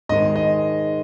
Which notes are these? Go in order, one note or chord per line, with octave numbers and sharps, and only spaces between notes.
G#2 D#3 G#3 D#5
D#5